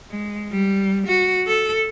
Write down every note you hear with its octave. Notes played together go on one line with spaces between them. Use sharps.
G#3
G3
F#4
A4